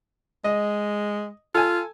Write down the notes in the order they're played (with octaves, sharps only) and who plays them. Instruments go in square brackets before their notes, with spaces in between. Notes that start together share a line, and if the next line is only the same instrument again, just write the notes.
[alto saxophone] G#3 [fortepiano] D#5
[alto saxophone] F4 [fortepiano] A4 G#5